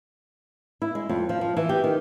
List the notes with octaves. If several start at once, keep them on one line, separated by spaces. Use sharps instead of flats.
E4
G#3
F2
F3
F3
E3
G4
D#3